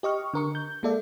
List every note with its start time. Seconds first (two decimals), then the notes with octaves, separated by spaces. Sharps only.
0.03 G4 D#5 C#6 F6
0.34 D3 A#4 C#6
0.55 G6
0.83 G#3 A#3 A4 D5 E5